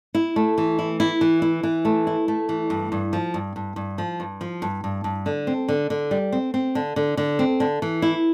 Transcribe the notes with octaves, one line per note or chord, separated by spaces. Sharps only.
E4
A3
E3
E4
E4
E3
E4
E3
A3
E4
A3
E3
G2
G2
F3
G2
G2
G2
F3
G2
F3
G2
G2
G2
D3
C4
D3
D3
G3
C4
C4
D3
D3
D3
C4
D3
E3
E4